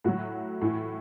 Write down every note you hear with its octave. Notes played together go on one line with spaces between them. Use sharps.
A2 F#3 F#4
A2 E3